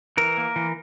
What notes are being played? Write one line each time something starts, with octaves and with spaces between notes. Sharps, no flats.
E3 A#4
A#3
E3